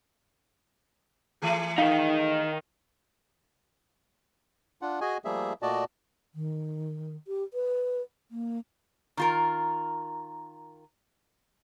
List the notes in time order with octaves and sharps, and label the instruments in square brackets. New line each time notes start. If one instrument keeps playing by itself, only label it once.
[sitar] E3 A3 G#4
[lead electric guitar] D#3 D#4 [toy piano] F5
[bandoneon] D4 F4 F#5
F#4 G#4 D#5 G#5
F3 G3 A3 A#3 G#4 E5
A#2 A3 F#4 D5 D#5 A5
[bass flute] D#3
G4
B4
A#3
[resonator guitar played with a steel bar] D#3 F4 A#4